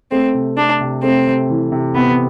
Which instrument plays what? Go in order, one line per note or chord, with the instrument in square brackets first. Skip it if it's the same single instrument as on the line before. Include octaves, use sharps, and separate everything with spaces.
[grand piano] A3 [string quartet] C4
[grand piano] C3
[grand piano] A3 [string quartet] D4
[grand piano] C3
[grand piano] A3 [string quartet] C4
[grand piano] C3
E3
C3
[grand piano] C3 [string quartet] B3